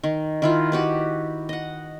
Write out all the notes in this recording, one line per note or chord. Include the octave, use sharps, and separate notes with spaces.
D#3
D#3 E4 F4
F#4 G4 B4
D#5 F#5